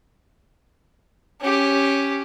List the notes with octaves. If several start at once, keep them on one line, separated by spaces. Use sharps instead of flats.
C#4 G4